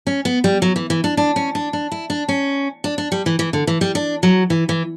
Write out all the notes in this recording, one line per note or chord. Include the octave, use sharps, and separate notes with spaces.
C#4
B3
G3
F#3
E3
E3
D4
D4
C#4
D4
D4
E4
D4
C#4
D4
D4
G3
E3
E3
D3
E3
G3
D4
F#3
E3
E3